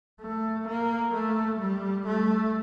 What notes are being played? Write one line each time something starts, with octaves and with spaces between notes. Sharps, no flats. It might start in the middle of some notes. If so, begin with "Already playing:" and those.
A3
A#3
A3
G3
A3